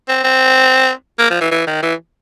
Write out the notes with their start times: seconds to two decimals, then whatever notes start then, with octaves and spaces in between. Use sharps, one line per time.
0.08 C4
0.24 C4
1.19 A#3
1.30 F3
1.41 E3
1.51 E3
1.67 D#3
1.82 E3